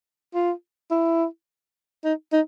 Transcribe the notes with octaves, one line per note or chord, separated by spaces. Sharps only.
F4
E4
D#4
D#4